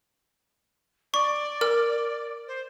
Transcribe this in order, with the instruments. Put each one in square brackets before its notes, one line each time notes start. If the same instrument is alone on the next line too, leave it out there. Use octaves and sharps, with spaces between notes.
[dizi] D5 [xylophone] C#6
[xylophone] A#4 F6
[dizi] C5